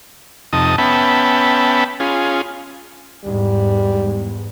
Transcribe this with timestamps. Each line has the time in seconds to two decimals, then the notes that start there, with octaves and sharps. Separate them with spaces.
0.53 F2 C3 D#4 A5 D#6
0.78 B3 C#4 E5 G5 A5 B5
2.00 C#4 F4 G#4
3.25 E2 G#2 G3